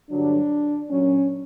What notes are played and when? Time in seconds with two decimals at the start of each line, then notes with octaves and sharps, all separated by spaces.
0.11 G2 D3 F#3 D4
0.89 A#2 F#3 C#4